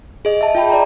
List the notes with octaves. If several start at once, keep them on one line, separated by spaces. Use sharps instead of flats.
G#4 D#5
E5 A5
F4 G5 B5
D5 E5 A#5